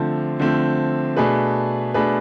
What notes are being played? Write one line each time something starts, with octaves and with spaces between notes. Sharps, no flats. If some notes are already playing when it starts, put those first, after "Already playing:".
Already playing: D3 F3 A3 C4
D3 F3 A3 C4
B2 A3 D4 G#4 B4
B2 A3 D4 G#4 B4